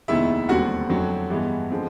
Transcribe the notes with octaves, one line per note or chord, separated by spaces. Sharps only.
F1 D#2 D#3 G#3 B3 E4 E5
E1 D#2 D3 G3 C4 F#4 F#5
F2 D3 F#3 A3
G2 E3 G#3 B3
D3 F3 G#3 C4